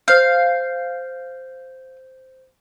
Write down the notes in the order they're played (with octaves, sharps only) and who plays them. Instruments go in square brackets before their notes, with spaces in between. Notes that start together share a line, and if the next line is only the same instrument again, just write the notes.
[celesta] C5 G6 [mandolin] F5